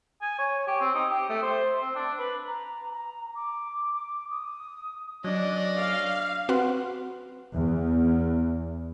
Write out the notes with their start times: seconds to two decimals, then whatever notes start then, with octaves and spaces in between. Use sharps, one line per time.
0.22 G#5
0.38 C#5
0.67 G4
0.80 C4
0.95 D#4
1.10 G4
1.29 A3
1.42 C5
1.82 C4
1.95 D4
2.19 B4
2.47 A#5
2.94 A#5
3.35 D6
4.30 D#6
5.24 F#3 C#4 D4 D5 D#5
5.77 F5
6.49 C4 F#4 B4 F#5 C6
7.53 E2